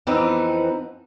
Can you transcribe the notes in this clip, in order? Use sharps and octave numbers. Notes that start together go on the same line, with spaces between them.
F2 E3 B3 C4 D#4 B4